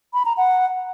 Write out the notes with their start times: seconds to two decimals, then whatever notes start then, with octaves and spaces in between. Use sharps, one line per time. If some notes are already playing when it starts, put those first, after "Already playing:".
0.14 B5
0.25 A#5
0.37 F#5